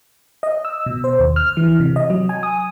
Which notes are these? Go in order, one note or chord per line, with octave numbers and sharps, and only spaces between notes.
D#5
E6
B2
C5
D#2
F6
E3
C3
D#5
F#3
G#5
D#6